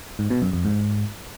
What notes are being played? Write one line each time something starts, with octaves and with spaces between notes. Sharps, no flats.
G#2
B2
F#2
F2
G#2